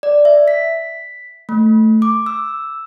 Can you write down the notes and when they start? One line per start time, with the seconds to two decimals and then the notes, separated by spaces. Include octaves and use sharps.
0.03 D5
0.25 E5
0.48 B6
1.49 A3
2.02 D6
2.26 E6